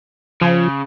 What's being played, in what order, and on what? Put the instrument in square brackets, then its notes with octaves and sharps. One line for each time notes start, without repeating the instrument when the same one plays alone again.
[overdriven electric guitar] C#3 [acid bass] F3